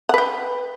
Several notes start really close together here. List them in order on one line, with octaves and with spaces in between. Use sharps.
F#5 B4 G5